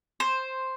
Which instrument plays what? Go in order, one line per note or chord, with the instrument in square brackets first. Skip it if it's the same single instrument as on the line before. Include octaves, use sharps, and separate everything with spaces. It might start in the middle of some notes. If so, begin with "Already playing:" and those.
[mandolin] C5